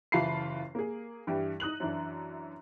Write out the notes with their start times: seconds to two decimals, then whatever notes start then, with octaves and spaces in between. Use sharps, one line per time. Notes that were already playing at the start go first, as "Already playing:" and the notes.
0.12 F#1 E3 F4 A5 B5 C7
0.75 A#3 G#4
1.27 G2 E3 G3
1.60 D#4 D#6 F#6 F#7
1.80 F#2 E3 D4